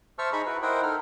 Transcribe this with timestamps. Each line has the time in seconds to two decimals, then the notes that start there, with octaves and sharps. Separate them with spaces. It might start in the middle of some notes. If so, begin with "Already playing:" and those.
0.19 C5 E5 A5 C#6 E6 F6
0.32 D#4 G#4 D#5 B5 C#6
0.46 E4 F#4 B4
0.62 E4 A#4 C5 D#5 F#5 G5
0.83 D#4 A4 F6